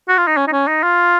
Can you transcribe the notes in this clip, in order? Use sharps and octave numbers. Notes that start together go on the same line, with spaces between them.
F#4
F4
D#4
C#4
D#4
C#4
D#4
F4